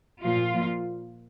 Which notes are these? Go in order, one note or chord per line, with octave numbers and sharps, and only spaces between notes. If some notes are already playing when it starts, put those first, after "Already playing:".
A#2 F3 F4
A#2 F3